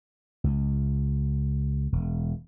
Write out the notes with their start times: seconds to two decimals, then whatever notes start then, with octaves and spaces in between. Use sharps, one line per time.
0.44 C#2
1.92 E1